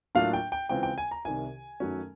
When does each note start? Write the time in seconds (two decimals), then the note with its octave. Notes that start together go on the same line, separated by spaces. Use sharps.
0.15 A2 F#3 A#3 D4 F4 F5
0.33 G5
0.52 G5
0.69 C#3 E3 G#3 C4 F4 G5
0.83 G5
0.98 G#5
1.11 A#5
1.25 C2 C3 D#3 G#5
1.80 F#2 D#3 F#3 A3 C#4